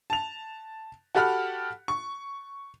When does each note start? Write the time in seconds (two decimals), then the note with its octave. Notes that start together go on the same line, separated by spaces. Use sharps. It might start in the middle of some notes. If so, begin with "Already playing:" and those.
0.10 A5 F7
1.15 F#4 G4 A4 F#5 B5 F6
1.88 C#6